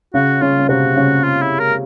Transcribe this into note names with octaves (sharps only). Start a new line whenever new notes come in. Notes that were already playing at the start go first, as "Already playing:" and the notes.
C#3 C#4 F#4
C#3 C#4 F4
C#4
C3 C4 F#4
C#3 C#4
F4
E4
A#4